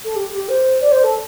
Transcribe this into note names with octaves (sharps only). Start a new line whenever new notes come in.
A4
G4
G4
C5
D5
C5
A4